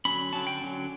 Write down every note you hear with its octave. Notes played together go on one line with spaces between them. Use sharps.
D3 F#3 C#4 B5
D3 F#3 C#4 A5
G5
D3 F#3 C#4